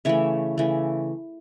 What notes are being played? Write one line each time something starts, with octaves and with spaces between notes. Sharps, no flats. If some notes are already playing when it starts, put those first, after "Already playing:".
C#3 E3 A3 C#5 E5
C#3 E3 A3